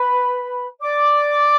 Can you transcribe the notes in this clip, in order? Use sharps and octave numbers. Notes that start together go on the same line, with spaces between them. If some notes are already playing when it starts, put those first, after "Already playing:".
Already playing: B4 B5
D5 D6